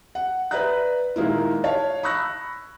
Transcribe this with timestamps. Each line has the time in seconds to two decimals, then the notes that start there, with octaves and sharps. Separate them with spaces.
0.15 F#5
0.51 B4 D5 E5 A#5 F#6
1.16 A#2 D#3 G#3 A#3 E4
1.64 C#5 F5 A5
2.03 B5 C#6 E6 F#6 A#6